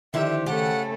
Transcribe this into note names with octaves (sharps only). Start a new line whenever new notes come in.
D3 D#3 F3 E4 G4 E5
C#3 A3 G4 A4 F#5